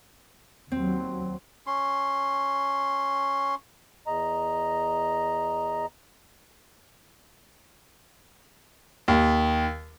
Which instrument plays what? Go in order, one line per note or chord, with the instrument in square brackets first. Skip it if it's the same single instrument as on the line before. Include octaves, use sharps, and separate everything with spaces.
[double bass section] D#2 F#3 [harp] C4
[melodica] C#4 C6
[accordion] E2 D#5 A#5
[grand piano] D#2